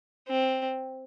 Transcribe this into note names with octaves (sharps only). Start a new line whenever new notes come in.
C4